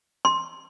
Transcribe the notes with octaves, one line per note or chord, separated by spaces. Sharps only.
C6